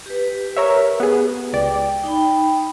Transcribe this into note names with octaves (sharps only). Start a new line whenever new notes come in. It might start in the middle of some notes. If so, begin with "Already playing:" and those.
G4 B4
A#4 C#5 E5
B3 G#4
C#2 D5 G5
D#4 G5 B5